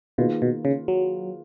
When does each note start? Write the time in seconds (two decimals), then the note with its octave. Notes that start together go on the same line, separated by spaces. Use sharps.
0.18 B2 D#3 A#3 F4 G#4 B4
0.42 B2
0.65 C#3
0.88 F#3